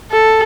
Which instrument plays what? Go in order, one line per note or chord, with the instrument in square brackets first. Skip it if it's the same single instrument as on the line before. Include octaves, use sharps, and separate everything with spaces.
[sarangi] A4